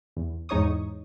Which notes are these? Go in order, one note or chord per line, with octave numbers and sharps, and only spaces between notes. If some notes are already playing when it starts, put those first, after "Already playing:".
E2
E2 G#2 D#4 C#5 C#6 D#6